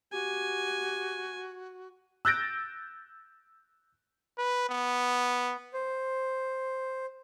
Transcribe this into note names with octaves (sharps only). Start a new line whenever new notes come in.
F#4 G4 G#5
E6 F#6 G6 A6 A#6 D7
B4
B3
C5